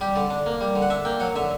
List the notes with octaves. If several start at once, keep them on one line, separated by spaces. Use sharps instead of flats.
G3 G4
D3 D5
D4
A#3
G3
D3
F#5
D4 E5
A#3 G5
F#3 F#5
D3 E5